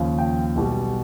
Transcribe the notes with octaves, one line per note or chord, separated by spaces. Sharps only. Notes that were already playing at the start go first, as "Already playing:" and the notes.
Already playing: D#2 C#3 F3
G5
B1 B2 G3